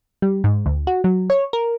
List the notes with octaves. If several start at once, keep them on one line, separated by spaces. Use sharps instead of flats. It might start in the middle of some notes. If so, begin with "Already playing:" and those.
G3
G#2
D2
F#4
F#3
C#5
A#4